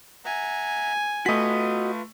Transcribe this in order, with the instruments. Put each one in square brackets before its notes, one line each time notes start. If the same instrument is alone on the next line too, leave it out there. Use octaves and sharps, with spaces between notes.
[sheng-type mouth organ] E5 F#5 A#5 [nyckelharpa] G#5
[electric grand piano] A3 B6 [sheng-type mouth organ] F4 B4 [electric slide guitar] F#4 D#5